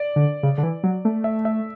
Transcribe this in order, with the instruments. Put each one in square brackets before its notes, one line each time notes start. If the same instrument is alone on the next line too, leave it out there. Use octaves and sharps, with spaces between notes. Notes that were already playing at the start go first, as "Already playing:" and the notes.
Already playing: [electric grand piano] D5
[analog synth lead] D3
C#3
D3
E3
F#3
A3
[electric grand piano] E5
E5